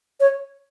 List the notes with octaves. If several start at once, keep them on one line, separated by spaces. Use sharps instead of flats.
C#5